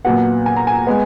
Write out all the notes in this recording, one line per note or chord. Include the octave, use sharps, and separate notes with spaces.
A#2 F#3 B3 F#5
G#5
A#5
G#5
G#3 B3